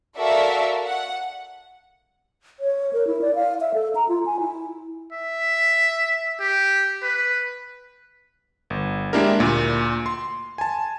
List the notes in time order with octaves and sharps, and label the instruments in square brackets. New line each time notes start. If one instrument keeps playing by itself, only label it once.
[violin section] F#4 A4 A#4 D5 E5 F5
F#5
[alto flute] C#5
A#4
E4
D5
F5
E5
A4
A#5
F4
G#5
E4
[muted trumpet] E5
G4
B4
[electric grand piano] G1
G#3 A#3 D4 E4 G4 A#4
D2 A#2
C6
G#5 A5